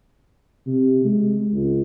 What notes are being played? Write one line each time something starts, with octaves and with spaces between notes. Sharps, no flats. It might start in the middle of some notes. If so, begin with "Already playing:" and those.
C3
G#3
C#2